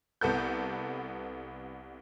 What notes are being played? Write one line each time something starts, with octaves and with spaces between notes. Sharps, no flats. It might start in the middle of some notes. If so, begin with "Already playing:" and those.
C2 B3 A4 G6